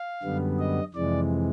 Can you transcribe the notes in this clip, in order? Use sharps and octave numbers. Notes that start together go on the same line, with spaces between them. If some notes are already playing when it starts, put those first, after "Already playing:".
Already playing: F5
F#2 D3 G3 B3
D#5
F2 C3 E3 G#3 D5